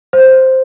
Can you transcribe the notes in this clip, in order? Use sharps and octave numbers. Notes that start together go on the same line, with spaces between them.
C5